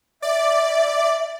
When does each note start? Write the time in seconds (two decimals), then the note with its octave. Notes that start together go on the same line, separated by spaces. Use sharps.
0.22 D5 E5